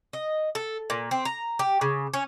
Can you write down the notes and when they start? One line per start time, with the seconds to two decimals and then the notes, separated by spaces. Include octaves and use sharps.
0.13 D#5
0.55 A4
0.90 A#2
1.11 C4
1.25 A#5
1.59 G4
1.81 C#3
2.14 C#4